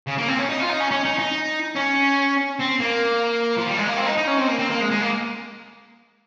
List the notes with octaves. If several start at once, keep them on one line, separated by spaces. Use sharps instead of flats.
C#3
A#3
C4
C#4
D#4
F4
D#4
C#4
C#4
D#4
D#4
C#4
C4
A#3
F3
G3
G#3
A#3
C4
D#4
D#4
C#4
C4
A#3
C4
A#3
G#3
G#3
A#3